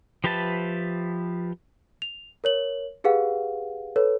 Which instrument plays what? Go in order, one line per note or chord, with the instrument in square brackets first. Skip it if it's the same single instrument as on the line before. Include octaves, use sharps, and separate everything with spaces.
[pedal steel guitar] F3 G4 B4 E5 A5
[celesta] F7
A#4 C#5 F#7
G4 G#4 B4 F5 F#5
A4 B4 C#5